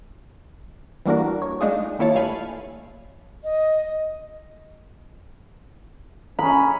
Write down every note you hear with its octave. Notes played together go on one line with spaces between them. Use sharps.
E3 G3 A#3 D4 F#4 A#4
C#5
G#3 A3 D4 D#4 F4 G#4
D#3 A#3 E4 F4 C#5 A5
G2 A3 F5 G#5 B5
D#5
C#4 B5